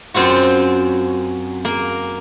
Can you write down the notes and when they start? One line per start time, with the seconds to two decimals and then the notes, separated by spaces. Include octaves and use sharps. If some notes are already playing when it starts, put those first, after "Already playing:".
0.14 F#2 C4 F4 F#4
1.65 A#3